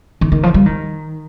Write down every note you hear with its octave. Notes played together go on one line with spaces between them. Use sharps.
D#3
D#3
F3
G3
D#3